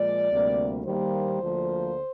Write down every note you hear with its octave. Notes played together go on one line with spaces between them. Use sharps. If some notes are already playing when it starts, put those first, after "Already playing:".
Already playing: A#2 F3 G#3 D5
D2 C3 G3 A#3
D#2 D#3 G3 A#3 C5
D2 D3 F3 A#3